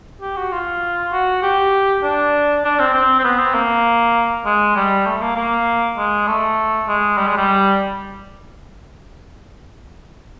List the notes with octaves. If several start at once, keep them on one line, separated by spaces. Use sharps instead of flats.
G4
F#4
F4
F#4
G4
D4
D4
C4
C4
C4
B3
C4
A#3
G#3
G3
A3
A#3
A#3
G#3
A3
G#3
G3
G#3
G3